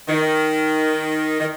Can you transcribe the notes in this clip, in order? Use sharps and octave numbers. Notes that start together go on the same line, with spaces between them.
D#3
D#3